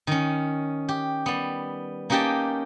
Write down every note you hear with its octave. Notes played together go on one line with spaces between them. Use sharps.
D#3 C#4
G4
G3 B3
A#3 C#4 D#4 G4 G5 A5